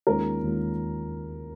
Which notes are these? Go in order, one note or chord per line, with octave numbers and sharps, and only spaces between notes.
D#2 D#3 G#3 C#4 F4 A#4
D#2 D#3 G#3 C#4 F4